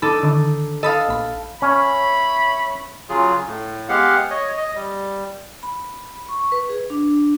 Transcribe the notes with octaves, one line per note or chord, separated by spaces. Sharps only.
D4 D#4 A4 B5
D3 D#3
A4 D#5 F5 B5 D#6
A#1 B5
C#4 C#5 E5 B5
C#3 F#3 F4 G#4
A2
G#3 B3 G4 F5 F#5
C#5 D#5
D#5
G3
B5
C#6
B4
G#4
D4